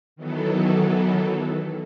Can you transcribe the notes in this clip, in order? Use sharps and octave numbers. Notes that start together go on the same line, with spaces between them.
D#3 E3 F#3 B3 A4